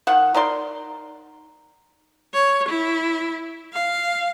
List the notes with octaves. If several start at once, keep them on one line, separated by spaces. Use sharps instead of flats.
D#3 F#5
D#4 A#4 D5 C6
C#5
E4
F5